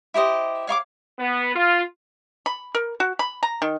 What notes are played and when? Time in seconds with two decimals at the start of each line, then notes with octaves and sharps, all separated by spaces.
0.14 E4 G4 C5 D#5
0.67 C#5 F5 C#6 D6
1.19 B3
1.55 F4
2.46 B5
2.75 A#4
3.00 F#4
3.19 B5
3.43 A#5
3.62 D#3